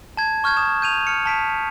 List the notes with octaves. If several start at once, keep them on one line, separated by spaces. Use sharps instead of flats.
A5 G#6
C#6 F6 G6 G#6
D#6 F6 E7
G6 D#7 F7
F6 C#7
A5 B6 D7